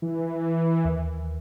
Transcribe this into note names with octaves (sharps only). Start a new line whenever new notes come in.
E3
D#2